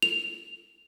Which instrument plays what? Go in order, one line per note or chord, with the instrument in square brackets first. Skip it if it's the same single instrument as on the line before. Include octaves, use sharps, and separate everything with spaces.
[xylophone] F7